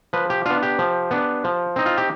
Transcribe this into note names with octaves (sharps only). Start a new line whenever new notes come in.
F3 B4
G4
B3 D4 F4
G4
F3
B3 D4
F3
C4 D#4
F4
G4